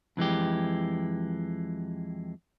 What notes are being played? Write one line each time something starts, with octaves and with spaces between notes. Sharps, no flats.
F2 E3 G#3 G4